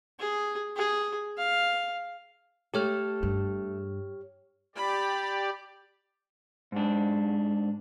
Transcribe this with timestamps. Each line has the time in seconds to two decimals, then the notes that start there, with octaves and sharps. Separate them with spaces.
0.19 G#4
0.76 G#4
1.37 F5
2.74 A3 G4 A4 C#5 F6
3.23 G2
4.76 G4 D5 B5
6.72 G#2 D4